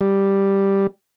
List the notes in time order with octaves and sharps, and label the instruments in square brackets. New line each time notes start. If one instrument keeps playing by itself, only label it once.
[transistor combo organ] G3